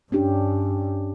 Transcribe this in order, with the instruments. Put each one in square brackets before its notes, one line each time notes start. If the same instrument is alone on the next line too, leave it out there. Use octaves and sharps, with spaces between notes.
[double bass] G2 [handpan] C#4 D4 G4